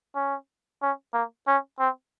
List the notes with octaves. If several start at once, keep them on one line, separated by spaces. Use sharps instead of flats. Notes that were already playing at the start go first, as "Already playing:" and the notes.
C#4
C#4
A#3
C#4
C4